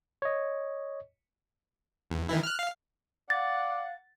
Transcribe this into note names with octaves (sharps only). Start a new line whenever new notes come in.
C#5 D#5
E2
D#3 E3 E4
F6 F#6
F5
D5 F5 F#5 A6